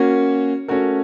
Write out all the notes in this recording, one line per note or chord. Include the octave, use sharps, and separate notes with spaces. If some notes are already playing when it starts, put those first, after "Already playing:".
Already playing: A#3 C#4 F#4
A3 C#4 F#4 A#4